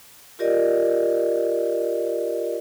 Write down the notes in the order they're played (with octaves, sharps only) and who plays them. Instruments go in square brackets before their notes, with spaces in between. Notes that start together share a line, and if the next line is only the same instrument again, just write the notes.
[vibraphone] F4 G4 A#4 D5 D#5